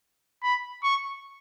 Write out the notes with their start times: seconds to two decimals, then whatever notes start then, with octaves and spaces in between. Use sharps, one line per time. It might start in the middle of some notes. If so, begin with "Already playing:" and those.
0.43 B5
0.84 C#6